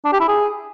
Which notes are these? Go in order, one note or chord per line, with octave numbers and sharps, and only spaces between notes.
D4
G4
E4
G#4